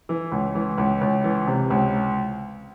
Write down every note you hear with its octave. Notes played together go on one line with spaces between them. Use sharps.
E3
C#2
E3
C#2
C#2
E3
C3
C#2